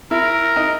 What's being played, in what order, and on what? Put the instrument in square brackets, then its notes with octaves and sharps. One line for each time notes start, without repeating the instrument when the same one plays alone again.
[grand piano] E4 [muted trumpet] A#4
[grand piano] D#4